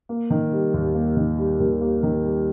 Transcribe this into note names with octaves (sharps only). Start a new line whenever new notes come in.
A#3
D#3
G3
D#2
A#3
D#3
G3
D#2
A#3
D#3
G3